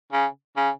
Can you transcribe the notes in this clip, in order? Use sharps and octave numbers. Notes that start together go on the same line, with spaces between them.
C#3
C#3